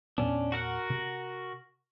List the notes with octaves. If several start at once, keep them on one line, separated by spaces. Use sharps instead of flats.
E2 A#2 B3 C#4 D4
F#4 A#4 F#5
C3